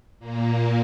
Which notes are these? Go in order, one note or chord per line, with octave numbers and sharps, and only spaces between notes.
A#2 A#3